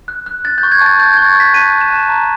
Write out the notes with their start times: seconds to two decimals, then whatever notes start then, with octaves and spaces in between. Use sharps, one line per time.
0.08 F#6
0.26 F#6
0.44 F#6 A6
0.58 G6
0.63 C#6
0.72 G#6
0.81 A5 A6
0.99 F#6 G6
1.13 G#6
1.17 C#6
1.26 A6
1.36 F#6 B6
1.54 A5 D#7
1.73 F#6
1.81 E7
1.90 A5
2.08 A#5